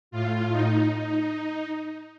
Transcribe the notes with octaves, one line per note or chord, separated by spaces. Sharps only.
A2 F4
D#4
D#4